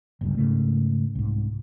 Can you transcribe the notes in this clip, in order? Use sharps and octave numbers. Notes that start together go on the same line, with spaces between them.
G1 C#2 G2
G#2 C#3 A3
C2 G#2